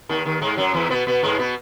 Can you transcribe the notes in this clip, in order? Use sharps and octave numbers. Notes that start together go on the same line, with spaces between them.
D#2 D#3
D#2 D#3
G#2 G#3
F#2 F#3
E2 E3
B2 B3
B2 B3
G#2 G#3
B2 B3